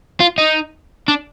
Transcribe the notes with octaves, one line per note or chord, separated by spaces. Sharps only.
F4
D#4
D4